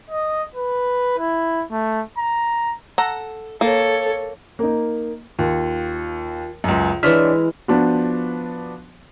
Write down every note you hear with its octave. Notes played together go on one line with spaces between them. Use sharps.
D#5
B4
E4
A3
A#5
A4 F#5 A#5
A#3 A4 C#5
A#3 D#4
D#2 F4
C#2 F#2
E3 G#3 D4 C#5 D5 E5 F6
F3 B3 D4 F4 F#4